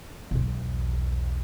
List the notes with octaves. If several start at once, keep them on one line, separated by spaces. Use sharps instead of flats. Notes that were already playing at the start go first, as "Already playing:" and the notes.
B1 E2